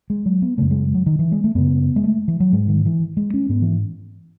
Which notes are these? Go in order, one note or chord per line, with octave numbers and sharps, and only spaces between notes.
G#3
F#3
B3
F#2 C#3 A3
G#3
F#3
D#3
E3
G#3
A3
F#2 C#3 B3
G#3
A3
E3
F#3
G#2 G#3
D#3
E3
G#3
C#4
G#2 B3
E3